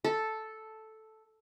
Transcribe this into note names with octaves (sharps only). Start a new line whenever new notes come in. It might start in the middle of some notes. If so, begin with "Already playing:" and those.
A4